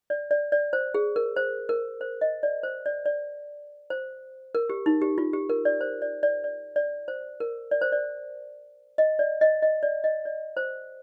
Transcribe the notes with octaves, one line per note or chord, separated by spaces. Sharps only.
D5
D5
D5
C5
G#4
A#4
C5
A#4
C5
D#5
D5
C5
D5
D5
C5
A#4
G4
D#4
G4
F4
G4
A#4
D5
C5
D5
D5
D5
D5
C5
A#4
D5
C5
D5
D#5
D5
D#5
D#5
D5
D#5
D5
C5